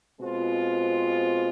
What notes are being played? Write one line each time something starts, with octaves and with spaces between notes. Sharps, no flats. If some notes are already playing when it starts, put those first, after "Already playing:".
B2 G#3 C4 F4 C5